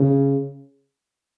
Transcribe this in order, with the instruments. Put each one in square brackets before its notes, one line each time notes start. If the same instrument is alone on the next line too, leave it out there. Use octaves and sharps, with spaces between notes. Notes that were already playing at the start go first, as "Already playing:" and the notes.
Already playing: [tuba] C#3